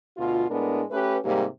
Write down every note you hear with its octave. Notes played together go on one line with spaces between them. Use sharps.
D2 B2 F4
A2 G#3 B3 D4 A#4
A3 C#4 G4 B4
G#2 C3 G3 A#3 G4